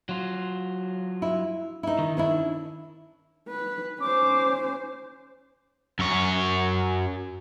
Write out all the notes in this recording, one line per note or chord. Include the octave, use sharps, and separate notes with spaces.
F#3 F4
E4
D#4 E4
D#3
C#4 D4 E4
B4
C#4 C5 D6
F#2 C#5